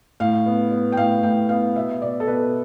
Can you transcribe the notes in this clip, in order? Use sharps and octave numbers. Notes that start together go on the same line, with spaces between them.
A2 F5
B3
B3
G5
A2 F5
A2 G5
B3 F5
B2 E5
B2 D5
A4
B2 B4